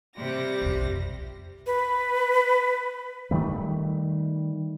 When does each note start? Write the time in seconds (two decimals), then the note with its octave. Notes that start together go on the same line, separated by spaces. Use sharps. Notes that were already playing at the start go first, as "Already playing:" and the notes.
0.15 C3 G3 A#6
0.61 B1 F2
1.67 B4
3.31 D#3 G3 A3